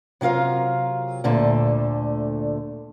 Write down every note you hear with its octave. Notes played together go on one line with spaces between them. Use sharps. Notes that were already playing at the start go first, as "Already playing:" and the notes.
C3 F#3 F4 A#4 F5
D2 A#2 D3 A3 A5